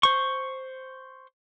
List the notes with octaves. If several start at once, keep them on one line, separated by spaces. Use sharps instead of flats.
C5 C#6